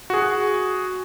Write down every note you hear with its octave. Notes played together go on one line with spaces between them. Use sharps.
F#4 G#4